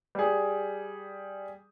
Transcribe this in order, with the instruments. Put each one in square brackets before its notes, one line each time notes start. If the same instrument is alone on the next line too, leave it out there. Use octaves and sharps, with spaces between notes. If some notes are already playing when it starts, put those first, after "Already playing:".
[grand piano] G3 G#4